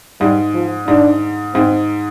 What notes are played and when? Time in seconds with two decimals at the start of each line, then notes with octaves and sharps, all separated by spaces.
0.20 G#2 G3
0.54 F3
0.87 G#2 D4
1.55 G#2 C4